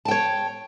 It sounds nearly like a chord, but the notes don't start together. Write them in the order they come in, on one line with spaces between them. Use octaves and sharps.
A5 G5 C#5